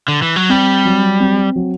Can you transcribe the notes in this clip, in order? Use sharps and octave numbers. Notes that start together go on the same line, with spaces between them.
D3
E3
F#3
G3 C4
F#3
C4
F#3